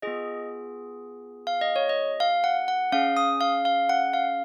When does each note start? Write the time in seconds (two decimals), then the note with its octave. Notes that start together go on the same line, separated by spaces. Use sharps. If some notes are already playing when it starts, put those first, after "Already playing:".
0.02 B3 F4 G#4 D#5
1.47 F5
1.61 D#5
1.76 C#5
1.89 D#5
2.20 F5
2.44 F#5
2.68 F#5
2.92 C#4 G#4 F5
3.17 D#6
3.41 F5
3.65 F5
3.89 F#5
4.14 F5